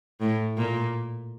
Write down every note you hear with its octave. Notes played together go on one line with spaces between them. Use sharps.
A2
A#2